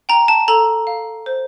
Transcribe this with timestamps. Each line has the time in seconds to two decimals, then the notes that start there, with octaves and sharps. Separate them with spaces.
0.09 G5 A#5
0.28 A5
0.48 A4 A#5
0.87 F5
1.26 C5